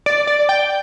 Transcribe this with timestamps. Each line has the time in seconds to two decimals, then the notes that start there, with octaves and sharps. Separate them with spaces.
0.06 D5
0.27 D5
0.49 G5